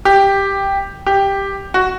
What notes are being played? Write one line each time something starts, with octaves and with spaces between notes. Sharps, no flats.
G4
G4
F#4